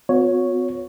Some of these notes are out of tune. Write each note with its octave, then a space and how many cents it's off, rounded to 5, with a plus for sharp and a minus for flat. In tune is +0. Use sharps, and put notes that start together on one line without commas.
B3 +40 F#4 -45 C#5 +0